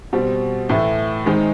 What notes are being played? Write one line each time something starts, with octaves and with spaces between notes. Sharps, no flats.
B2 G3 C4
A2 E3 A3
D#3 G#3 C4 D#4